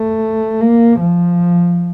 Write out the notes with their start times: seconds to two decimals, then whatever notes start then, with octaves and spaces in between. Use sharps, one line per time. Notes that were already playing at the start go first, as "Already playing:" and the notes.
Already playing: A3
0.61 A#3
1.00 F3